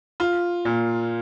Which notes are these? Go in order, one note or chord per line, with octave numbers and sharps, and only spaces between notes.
F4
A#2